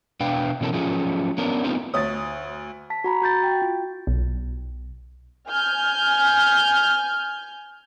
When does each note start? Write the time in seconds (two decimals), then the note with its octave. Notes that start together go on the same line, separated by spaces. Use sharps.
0.20 B2 D4 B4 F5 G5
0.61 B2 E3 C#4 A4 A#4
0.73 F3 F#3 A3 C#4 F4 G#4
1.38 B3 C#4 D4 A#4
1.64 A3 B3 C4 D#4 F4
1.94 D2 C#5 D#6 A6
2.90 A5 B6
3.04 F#4 A#5 B5
3.22 F#4 G6 A6
3.43 G5
3.62 F4
4.07 B1
5.49 G#5 F6 G6